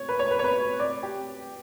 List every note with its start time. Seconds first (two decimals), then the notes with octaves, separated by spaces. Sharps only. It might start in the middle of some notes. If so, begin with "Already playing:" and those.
Already playing: C#5
0.09 B4
0.19 C#5
0.31 B4
0.39 C#5
0.44 B4
0.79 D5
1.03 G4